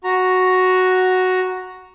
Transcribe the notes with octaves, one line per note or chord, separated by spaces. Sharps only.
F#4 A#5